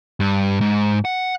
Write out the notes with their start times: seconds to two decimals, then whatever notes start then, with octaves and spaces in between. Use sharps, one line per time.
0.20 G2
0.61 G#2
1.05 F#5